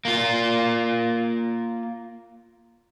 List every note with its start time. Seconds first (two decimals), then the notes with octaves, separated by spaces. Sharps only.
0.05 A#3 F4